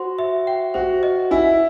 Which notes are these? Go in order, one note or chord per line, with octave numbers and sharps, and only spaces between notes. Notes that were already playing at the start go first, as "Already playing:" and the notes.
Already playing: F#4 C5 C6
E5
G5
F#4 C5
D#5
E4 G#5